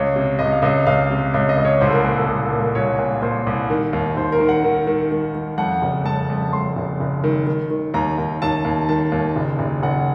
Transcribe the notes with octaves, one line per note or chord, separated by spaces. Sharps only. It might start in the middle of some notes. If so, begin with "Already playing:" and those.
Already playing: C#2 C#5
C3
C#2 D#5
F5
C#2 D#5
C#2 F5
C3
C#2
D#5
C#2
C#5
C2 C5
A4
A#4
A#2 A#4
A4
C2 A4
A4
A#2
A#4
C2 C#5
A#2
A#2 C5
C2
D#3
D#2
D#2 C5
A#4
D#3
F#5
D#3
D#3
D#3
D#3
F2 F#5
F#1
F2 A5
F2
F2 C6
F#1
F#1
D#3
D#3
D#3
D#2 A#5
D#2
D#2 A5
D#2
D#3 A5
D#2
F#1
F#1
F#1 F#5